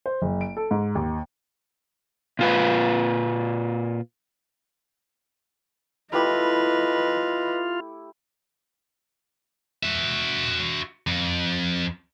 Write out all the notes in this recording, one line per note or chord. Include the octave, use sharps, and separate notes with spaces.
C5
F#1
D7
A4
G#2
D#2
A#2 F4 B4
A3 E4 F4 G4 B4 D#5
F#4 E5
F2